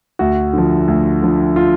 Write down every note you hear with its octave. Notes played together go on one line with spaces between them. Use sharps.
D2 F#4
D3 F3
D2
D3 F3
F4